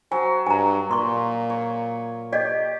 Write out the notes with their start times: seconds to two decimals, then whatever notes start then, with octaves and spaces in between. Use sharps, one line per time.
0.12 F#3 C5 G#5
0.47 G2 G#5 A#5
0.91 A#2 C6 C#6
1.50 C#5
2.33 G4 D5 D#5